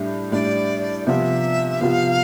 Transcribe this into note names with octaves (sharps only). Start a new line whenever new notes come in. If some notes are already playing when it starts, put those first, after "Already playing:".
Already playing: A2 G3 D4
A2 G3 D4 D5
C3 F3 B3 F4 E5
C3 F3 B3 F4 F5